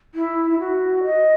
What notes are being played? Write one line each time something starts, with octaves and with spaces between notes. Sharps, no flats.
E4
E4
F#4
D#5